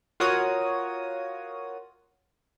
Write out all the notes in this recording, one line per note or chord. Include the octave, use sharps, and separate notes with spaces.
F4 F#4 A#4 C#5 D#6